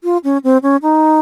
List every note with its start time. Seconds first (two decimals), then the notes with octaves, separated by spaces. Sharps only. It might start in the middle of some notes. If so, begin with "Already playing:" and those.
0.04 F4
0.24 C#4
0.44 C4
0.63 C#4
0.82 D#4